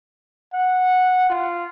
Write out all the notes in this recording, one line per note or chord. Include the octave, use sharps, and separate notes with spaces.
F#5
F4